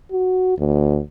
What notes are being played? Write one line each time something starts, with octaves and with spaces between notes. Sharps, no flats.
F#4
D2